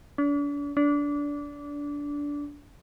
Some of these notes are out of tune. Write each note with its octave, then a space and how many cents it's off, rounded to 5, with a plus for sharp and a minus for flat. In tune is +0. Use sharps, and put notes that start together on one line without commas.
D4 -40
D4 -20